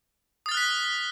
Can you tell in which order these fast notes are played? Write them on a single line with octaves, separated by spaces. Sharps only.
D#6 A6 F6 F#6 B6